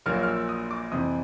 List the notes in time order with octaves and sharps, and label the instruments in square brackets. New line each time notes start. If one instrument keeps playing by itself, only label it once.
[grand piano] A#1 A#2 F#3 A#3 F6
F6
E6
D#6
D6
F2 C3 E3 D#6